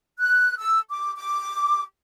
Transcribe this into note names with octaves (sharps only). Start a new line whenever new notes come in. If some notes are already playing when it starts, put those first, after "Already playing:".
F#6
E6
D6
D6